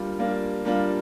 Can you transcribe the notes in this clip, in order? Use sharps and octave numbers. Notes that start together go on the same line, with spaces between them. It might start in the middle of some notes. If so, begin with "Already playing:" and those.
Already playing: G3 A#3 D4 F4
G3 A#3 D4 F4
G3 A#3 D4 F4